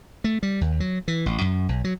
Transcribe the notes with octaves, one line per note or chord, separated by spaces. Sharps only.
A3
G3
D#2
F#3
E3
A1
F#2
B1
F#3